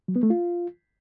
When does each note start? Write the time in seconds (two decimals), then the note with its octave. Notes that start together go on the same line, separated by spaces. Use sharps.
0.08 F#3
0.16 B3
0.23 A3
0.30 F4